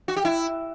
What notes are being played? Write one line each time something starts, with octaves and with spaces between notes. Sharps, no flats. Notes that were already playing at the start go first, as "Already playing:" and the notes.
F#4
G4
E4